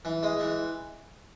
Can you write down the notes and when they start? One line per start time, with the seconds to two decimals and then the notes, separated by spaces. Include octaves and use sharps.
0.05 E3
0.23 G#3
0.40 E3